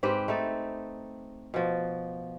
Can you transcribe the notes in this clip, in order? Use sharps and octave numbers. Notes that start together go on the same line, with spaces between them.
G#2 C4 G4 B4
A3 D#4 A4
B2 F3